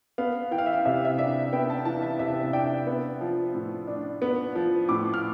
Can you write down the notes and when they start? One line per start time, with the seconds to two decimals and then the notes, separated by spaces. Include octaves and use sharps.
0.18 B3 F5
0.51 E3 G5
0.58 F5
0.66 E5
0.73 F5
0.85 C3 E5
0.96 F5
1.05 E5
1.18 D4 E5
1.53 B3 G5
1.70 A5
1.85 E3 A5
2.02 E5
2.19 C3 E5
2.53 D4 G5
2.87 B3
3.21 F3
3.54 A2
3.88 D4
4.22 B3
4.55 F3
4.89 A2 D6
5.14 F6